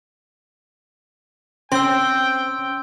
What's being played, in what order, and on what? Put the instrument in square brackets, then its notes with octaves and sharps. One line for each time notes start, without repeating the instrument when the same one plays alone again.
[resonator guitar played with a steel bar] C4 [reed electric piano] C#4 [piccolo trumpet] G5 [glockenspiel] C6 E6